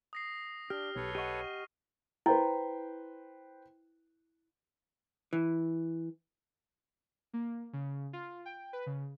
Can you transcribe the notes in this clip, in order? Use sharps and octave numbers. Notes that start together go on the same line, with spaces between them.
D#6 A#6 C7
D4 G4 F6
B1 A4 B4 C#5
G4 D#5 F#5 C#6 D#7
E4 B4 C5 G5
E3
A#3
C#3
F4
G5
B4
C#3